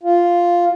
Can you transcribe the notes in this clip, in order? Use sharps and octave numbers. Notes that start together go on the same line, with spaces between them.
F4